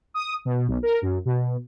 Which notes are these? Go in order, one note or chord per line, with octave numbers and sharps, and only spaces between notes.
D#6
B2
B1
A#4
F#2
B2